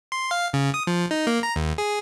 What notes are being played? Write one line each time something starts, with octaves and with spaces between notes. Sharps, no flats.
C6
F5
C#3
D#6
F3
D#4
A#3
A#5
D#2
G#4